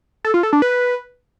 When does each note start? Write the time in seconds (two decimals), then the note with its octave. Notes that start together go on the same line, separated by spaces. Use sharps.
0.25 A4
0.34 F4
0.43 A4
0.53 D4
0.62 B4